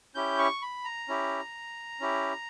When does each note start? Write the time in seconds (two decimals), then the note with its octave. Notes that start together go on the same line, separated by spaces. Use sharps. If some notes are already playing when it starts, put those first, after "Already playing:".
0.15 C#4 E4 G4 G6
0.38 C#6
0.62 B5
0.84 A#5
1.08 C#4 E4 G4
2.00 C#4 E4 G4